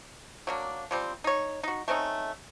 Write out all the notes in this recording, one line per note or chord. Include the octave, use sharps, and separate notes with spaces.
F#3 A#3 D4
F3 G3 C4
D#4 C#5
D#4 F#4
A3 C4 C#4 D#4